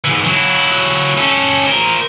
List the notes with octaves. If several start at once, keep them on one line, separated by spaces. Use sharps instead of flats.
G#2 E3
F#3 E4
C#4 A4
A#4 C5